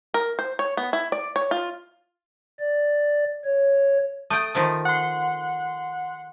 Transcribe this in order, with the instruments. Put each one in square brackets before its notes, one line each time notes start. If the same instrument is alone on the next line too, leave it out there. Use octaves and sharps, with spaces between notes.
[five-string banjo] A#4
C5
C#5
B3
E4
D5
C#5
F4
[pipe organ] D5
C#5
[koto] A3 G5 [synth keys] D#6
[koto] D#3 F3 A3
[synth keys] F#5 C6